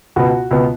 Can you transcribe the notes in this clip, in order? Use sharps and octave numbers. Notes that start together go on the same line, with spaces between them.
C#2 B2 B3 F#4
C#2 B2 B3